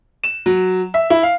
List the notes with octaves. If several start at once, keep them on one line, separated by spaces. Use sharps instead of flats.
E7
F#3
E5
E4
F5